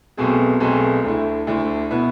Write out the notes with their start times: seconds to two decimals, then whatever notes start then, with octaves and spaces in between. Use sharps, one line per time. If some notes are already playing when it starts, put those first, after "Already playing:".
0.17 B1 B2 A3 C4 G#4
0.60 B1 B2 A3 C4 G#4
1.04 D2 D3 A3 E4
1.47 D2 D3 A3 E4
1.91 B2 B3 E4